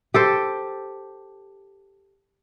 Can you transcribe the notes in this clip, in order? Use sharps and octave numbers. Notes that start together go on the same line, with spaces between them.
G4 A4 C5